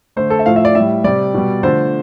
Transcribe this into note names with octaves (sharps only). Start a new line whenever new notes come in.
D3 A3 C5
A4
E5
A2 F3 A3 F5
E5
D5
A2 G3 E5
C3 G3 D5
B2 G3
D3 F3 A3 C5